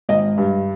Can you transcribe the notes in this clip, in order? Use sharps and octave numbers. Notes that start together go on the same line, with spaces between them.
G#1 D#5
G2